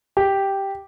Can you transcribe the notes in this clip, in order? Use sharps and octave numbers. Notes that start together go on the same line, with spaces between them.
G4